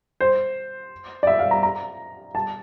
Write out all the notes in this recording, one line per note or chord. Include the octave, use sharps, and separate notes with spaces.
C5
D5
E5
F5
A#5
A#5
A5